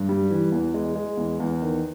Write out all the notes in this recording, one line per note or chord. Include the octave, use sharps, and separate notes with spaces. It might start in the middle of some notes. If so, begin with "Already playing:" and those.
Already playing: G2
G3
E3
E2
G#3
G#3
E2
E2
D#3